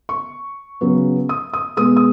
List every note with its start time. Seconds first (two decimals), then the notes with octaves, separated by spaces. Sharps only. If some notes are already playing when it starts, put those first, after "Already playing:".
0.09 C#6
0.81 C#3 F#3 B3
1.29 D#6
1.53 D#6
1.77 B2 G#3 B3 D#6
1.97 D#6